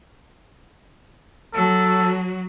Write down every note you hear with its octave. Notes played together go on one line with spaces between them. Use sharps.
F#3 A4